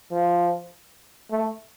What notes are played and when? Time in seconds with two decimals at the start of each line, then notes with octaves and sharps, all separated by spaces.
0.12 F3
1.31 A3